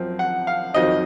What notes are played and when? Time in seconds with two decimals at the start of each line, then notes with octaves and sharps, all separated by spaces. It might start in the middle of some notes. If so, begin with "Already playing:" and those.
Already playing: F#2 F3 C4
0.19 F#5
0.47 F5
0.74 F2 D#3 F#3 C4 D#4 D#5